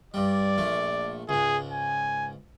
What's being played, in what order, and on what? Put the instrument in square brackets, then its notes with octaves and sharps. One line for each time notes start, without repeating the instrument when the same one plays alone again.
[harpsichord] G2 G3 [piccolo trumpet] D5
[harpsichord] A#1 A3
[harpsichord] C#2 G#2 [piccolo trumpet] G#4
[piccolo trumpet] G#5